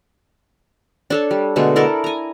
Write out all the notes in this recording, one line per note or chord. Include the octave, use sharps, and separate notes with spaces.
D4 A4 C#5
G3
B2 D3 G#3 A3
E4 A4 A#4 D5
G#5 A#5